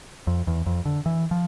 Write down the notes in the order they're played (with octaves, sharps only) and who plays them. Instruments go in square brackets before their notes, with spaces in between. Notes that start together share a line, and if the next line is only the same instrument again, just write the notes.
[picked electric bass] F2
E2
F2
D3
E3
F3